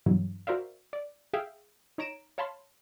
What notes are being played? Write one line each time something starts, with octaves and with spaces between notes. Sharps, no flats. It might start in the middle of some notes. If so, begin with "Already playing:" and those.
G2 B2 E3 F#3
F#4 A#4 C5 D5 E5 F5
D5
G#4 E5 F5 G5
D#4 C#5 A#5 D7 E7
C#5 F5 A5 B5 C6